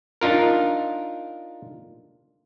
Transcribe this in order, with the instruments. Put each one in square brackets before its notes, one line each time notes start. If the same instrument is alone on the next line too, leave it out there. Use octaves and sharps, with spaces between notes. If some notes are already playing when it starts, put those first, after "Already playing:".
[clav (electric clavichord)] D4 D#4 F4 A#4